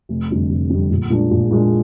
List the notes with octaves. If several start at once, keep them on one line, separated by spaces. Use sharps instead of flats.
F1
F2 D3 G3
F1
F2 D3 G3
A#1
A#2 G#3 D4
A#1
A#2 G#3 D4